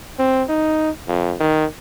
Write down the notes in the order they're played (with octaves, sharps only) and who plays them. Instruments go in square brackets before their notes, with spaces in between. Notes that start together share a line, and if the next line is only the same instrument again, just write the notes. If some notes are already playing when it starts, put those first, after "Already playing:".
[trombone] C4
D#4
F2
D#3